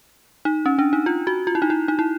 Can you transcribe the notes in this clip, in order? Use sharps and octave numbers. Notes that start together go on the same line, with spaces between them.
D#4
C#4
D4
D#4
F4
F#4
F4
E4
D#4
E4
D#4
E4